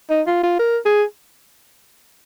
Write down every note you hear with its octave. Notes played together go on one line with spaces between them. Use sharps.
D#4
F4
F4
A#4
G#4